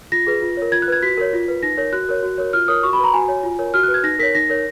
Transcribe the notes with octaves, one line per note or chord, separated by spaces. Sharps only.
F4 A#6
G#4 B4
F4
A#4 C#5
F4 G#6
F#6
B4 G#6
F#4 B6
A#4 C#5
F4
B4
D#4 A#6
A#4 C#5
F#4 F#6
A#4 C#5
F#4
A#4 C#5
F4 F6
A#4 C#5 D#6
F#4 C#6
B5
B4 A#5
F#4 G#5
C#5
F4
A#4 C#5
F#4 F6
F#6
B4
G#6
D#4 A#6
A#4 C#5 B6
D#4 A#6
A#4 C#5